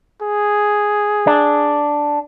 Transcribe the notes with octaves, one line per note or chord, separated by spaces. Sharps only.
G#4
D4